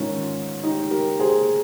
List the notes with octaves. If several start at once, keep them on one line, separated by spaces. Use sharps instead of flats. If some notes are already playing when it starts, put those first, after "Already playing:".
Already playing: G#2 D#3 C#4 F4
D#4 G4
G4 A#4
G#4 C5